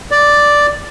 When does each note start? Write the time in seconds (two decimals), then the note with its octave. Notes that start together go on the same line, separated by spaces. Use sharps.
0.11 D5